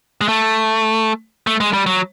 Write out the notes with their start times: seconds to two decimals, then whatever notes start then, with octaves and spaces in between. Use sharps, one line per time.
0.21 G#3
0.28 A3
1.47 A3
1.60 G#3
1.73 G3
1.86 F#3